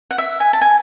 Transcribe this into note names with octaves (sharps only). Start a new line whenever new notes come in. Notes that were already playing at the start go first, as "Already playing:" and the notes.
F#5
E5
G#5
A5
G#5